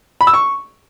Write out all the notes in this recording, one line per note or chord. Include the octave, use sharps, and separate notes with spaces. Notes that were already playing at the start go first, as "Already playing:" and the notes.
B5
E6
C#6